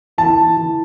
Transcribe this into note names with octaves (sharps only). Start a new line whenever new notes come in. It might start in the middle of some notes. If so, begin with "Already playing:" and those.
E3 A5
E3
E3